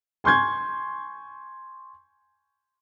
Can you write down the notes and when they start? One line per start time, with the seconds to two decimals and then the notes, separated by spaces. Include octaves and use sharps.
0.24 G#5 C6 C#6 G6 G#6